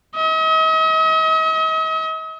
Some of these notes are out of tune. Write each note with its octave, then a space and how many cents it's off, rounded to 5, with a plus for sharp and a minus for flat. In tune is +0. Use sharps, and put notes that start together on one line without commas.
D#5 +45